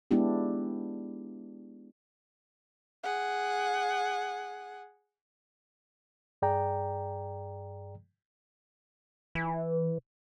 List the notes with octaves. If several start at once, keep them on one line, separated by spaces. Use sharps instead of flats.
G#3 B3 D4 E4 G4
G#4 F#5
G2 G#4 D5 G5 A#5
E3